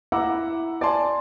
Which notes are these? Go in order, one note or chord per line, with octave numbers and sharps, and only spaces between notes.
E4 F#5 A#5 B5 D6 E6
D5 G#5 A5 C6